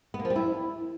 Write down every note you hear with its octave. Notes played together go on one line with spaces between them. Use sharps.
B3
A#3
F3
G3
E4